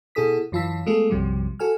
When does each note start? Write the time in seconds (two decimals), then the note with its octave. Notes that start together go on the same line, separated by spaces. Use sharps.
0.15 B2 E4 G#4 A4 D#6 B6
0.52 F#2 E3 F4 A5 E6 B6
0.86 G#3 A3 B3 F4 G#4 A4
1.10 B1 F#2 C3 F3 G3
1.59 F#4 A4 G#5 F6